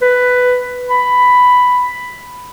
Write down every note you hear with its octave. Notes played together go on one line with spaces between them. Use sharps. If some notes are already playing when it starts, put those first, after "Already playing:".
B4
B5